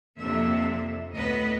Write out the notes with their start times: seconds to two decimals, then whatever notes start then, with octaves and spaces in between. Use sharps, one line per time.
0.18 F2 C3 A#3 D4 E5
1.13 D2 A2 B3 B4 D#5